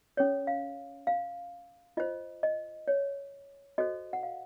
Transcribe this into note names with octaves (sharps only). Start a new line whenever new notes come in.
C#4 A4 C#5
F5
F5
F4 C5 D#5
D#5
C#5
F#4 A4 C5 D#5
F#5
F5